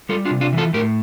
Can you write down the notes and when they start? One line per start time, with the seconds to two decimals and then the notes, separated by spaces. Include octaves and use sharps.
0.09 G3 F4 A4
0.25 D4 F4
0.31 C3
0.41 D4 F4
0.53 E3
0.58 F4 A4
0.73 A2 G4 A#4